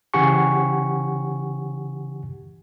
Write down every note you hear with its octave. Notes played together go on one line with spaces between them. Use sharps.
C#3 E3 G4 F#5 G#5 C#6